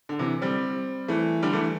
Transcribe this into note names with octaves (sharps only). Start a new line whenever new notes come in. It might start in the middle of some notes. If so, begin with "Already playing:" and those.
D3
C3 E3
G3 C4
E3 A3
D3 G3
E3 A3